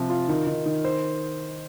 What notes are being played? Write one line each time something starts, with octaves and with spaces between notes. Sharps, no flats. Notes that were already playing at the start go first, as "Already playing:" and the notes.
Already playing: C3 F3
F4
D#3
D#3
D#3
C5